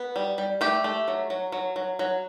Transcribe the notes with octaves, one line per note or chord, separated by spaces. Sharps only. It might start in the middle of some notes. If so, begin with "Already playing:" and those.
Already playing: B3
G3
G3
A3 G4
A3
F#3
F#3
F#3
F#3
F#3